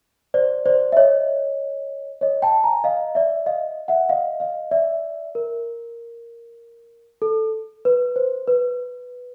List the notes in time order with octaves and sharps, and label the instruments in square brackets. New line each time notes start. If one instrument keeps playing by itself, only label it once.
[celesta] C5 D5
C5 D5
E5
C#5 D#5
C#5 D#5
G5 A5
G#5 A#5
D#5 F5
D5 E5
D#5 F5
E5 F#5
D#5 F5
D#5 F5
D5 E5
A#4
A4
B4
C5
B4